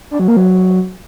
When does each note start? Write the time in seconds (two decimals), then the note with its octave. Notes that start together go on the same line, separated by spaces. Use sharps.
0.11 D4
0.20 F#3
0.28 A#3
0.37 F#3